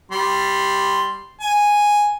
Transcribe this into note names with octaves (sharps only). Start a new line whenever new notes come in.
G3 C6
G#5